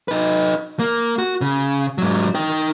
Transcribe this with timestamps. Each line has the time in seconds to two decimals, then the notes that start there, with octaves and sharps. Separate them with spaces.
0.08 D#4 B4
0.79 A#3
1.18 F#4
1.41 C#3
1.98 G#2 F#3
2.35 D#4 G5